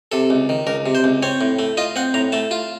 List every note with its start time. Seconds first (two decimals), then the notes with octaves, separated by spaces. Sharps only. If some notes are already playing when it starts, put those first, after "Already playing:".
0.12 C3 A4
0.30 C#2
0.49 D#3
0.67 C#2 A#4
0.86 C3
0.95 C5
1.04 C#2
1.23 C4 C#5
1.41 A2
1.59 A3
1.77 F4 D#5
1.96 C4 F#5
2.14 A2 A#5
2.32 A3 A5
2.51 F4